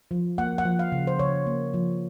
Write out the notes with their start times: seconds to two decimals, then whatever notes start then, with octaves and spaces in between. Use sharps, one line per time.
0.11 F3
0.38 A#3 F#5
0.58 F#5
0.65 F3
0.79 F5
0.92 C#3
1.07 C5
1.19 C#3 C#5
1.47 A#3
1.74 F3